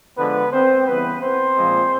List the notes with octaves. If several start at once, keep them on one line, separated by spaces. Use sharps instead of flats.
D3 F3 G#3 B3 B4
C4 C5
C#3 E3 G3 B3 B4
C4 C5
A#2 F3 G#3